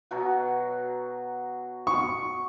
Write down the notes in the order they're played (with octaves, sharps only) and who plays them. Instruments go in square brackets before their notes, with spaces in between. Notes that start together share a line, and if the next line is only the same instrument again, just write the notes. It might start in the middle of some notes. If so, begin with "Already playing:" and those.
[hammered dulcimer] B2 F#3 F#4
[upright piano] C#6